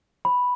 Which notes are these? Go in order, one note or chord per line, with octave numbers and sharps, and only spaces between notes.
B5